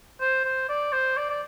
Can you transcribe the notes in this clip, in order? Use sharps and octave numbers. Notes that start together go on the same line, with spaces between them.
C5
C5
D5
C5
D5
D5